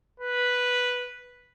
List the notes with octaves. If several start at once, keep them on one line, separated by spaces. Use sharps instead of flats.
B4